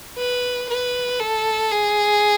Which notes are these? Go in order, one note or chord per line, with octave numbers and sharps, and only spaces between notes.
B4
B4
A4
G#4